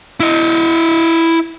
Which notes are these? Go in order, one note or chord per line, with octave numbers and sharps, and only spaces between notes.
E4 D#5